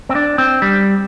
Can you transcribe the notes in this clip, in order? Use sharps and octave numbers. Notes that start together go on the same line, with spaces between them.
C4
D4
C4
G3